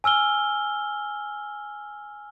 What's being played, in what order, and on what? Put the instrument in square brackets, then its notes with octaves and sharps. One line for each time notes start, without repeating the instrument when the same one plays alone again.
[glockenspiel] G#5 E6 F6 G7